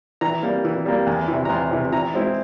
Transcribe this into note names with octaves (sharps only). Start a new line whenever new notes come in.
E3 A#5
G3 A#3
E3
G3 A#3
E2
C3 E3
A#5
E2 C6
C3 E3
E3 A#5
G#3 C4 E4